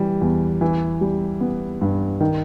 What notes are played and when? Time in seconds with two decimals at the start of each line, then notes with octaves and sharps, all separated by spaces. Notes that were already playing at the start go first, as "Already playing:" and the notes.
Already playing: E3 G3
0.21 E2
0.61 E3
1.01 G3
1.41 B3
1.81 G2
2.20 D#3